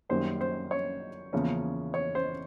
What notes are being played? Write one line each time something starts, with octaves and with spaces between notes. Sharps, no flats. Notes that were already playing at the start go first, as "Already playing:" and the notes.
F#2 D#3 G3 A#3 C#4 C5
C5
C#5
E2 C#3 F3 A#3 C#4
C#5
C5